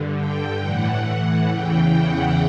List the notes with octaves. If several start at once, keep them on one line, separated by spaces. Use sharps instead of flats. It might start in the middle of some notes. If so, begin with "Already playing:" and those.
Already playing: G2 D3
G5
A2 E3 F#5
E2 C#3 E3 G5
F#5